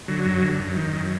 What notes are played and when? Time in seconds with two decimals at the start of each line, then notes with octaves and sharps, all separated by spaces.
0.08 D3 F#3
0.25 F#2
0.42 D3
0.59 F#2
0.76 D#3
0.93 F#2